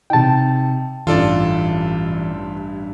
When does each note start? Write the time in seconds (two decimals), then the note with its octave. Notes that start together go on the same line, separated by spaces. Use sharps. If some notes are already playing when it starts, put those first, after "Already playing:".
0.10 C3 D#4 G5 A5
1.07 A1 G2 E3 F4 A4 D5